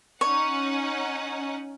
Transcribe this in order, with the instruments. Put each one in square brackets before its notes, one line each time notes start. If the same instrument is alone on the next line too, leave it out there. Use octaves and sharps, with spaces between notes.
[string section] C#4 D#4 F#5 [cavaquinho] C#5